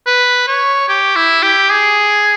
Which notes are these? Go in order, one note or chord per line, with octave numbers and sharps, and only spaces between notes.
B4
C#5
G4
E4
G4
G#4